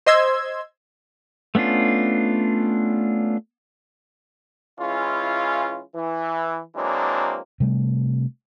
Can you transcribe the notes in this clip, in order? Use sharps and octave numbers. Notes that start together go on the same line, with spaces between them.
C5 D#5 C6 E6 G#6
A3 B3 C#4 D4 F4
E3 G#3 C#4 E4 F4
E3
E3 F#3 G#3 A#3 C4 D4
C3 G3 A3